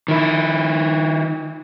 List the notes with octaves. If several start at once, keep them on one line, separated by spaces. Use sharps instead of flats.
D#3 E4